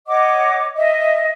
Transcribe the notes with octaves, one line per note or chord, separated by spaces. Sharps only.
C#5 D#5 F#5 D6
D#5 E5